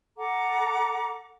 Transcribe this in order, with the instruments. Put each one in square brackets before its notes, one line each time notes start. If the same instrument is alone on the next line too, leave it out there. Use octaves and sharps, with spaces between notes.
[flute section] A4 F#5 A#5 D6